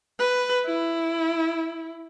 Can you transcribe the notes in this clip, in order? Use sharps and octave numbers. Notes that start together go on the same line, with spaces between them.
B4
E4